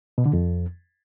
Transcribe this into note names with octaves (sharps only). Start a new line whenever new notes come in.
B2
D3
F2